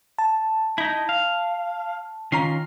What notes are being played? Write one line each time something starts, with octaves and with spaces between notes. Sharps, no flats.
A5
D#4 E4
F5
D#3 C#4 F4 A#5 C7